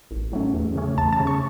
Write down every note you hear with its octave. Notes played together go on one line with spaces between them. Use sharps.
A1
A2 F#3 A3 C#4
E2
C#3 A3 C#4
E2 A5
A5
C#3 A3 C#4
C#6